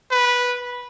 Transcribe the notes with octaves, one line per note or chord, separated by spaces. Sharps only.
B4